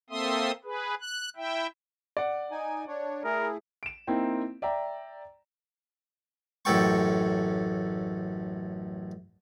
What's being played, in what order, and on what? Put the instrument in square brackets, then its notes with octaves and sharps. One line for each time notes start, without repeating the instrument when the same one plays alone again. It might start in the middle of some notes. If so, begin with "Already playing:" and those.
[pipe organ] A#3 C4 A4 E5 C6 D#6
G#4 B4
F#6
E4 E5 G5
[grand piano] D5 F#5
[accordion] D#4 G#5
D4 C#5
[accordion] A3 E4 G#4 [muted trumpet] A#4
[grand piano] D7 E7
A#3 C4 D#4 E4 G5
D5 E5 G5 A#5
[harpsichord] A1 F#2 A2 A4 G5 C#6